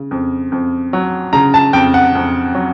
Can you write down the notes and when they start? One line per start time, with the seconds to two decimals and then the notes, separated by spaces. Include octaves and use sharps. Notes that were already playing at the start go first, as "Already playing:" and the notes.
Already playing: C#3
0.11 F2
0.52 F2
0.93 F#3
1.33 C#3 A#5
1.54 A5
1.73 F2 G5
1.94 F#5
2.15 F2
2.55 F#3